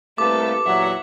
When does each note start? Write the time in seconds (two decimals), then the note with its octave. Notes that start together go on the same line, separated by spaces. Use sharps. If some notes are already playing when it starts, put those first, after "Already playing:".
0.18 C2 A3 A#3 G4 A4 B4 D6
0.65 E2 A#2 F#3 E5 F#5